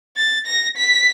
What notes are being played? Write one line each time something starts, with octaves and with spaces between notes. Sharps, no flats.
A6
A#6
B6